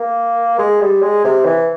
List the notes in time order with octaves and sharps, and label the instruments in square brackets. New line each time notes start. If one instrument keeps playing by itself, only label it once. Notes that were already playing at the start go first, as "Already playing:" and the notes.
Already playing: [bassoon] A#3
G#3
G3
G#3
C3
E3